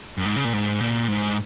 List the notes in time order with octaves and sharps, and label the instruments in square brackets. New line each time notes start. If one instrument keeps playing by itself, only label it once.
[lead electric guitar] F#2
G#2
C#3
A#2
G#2
A#2
G#2